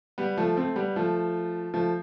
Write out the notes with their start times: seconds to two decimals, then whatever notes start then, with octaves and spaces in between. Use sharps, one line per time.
0.18 G3 B3
0.37 F3 A3
0.57 A3 C4
0.76 G3 B3
0.96 F3 A3
1.74 F3 A3